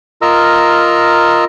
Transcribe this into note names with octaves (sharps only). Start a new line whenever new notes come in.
F4 A#4 D#5 A#5 E6